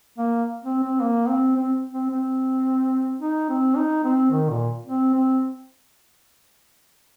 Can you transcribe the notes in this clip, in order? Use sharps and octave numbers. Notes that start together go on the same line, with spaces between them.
A#3
C4
C4
A#3
C4
C4
C4
C4
D#4
C4
D#4
C4
D#3
A#2
C4
C4